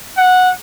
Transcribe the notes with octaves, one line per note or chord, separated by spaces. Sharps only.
F#5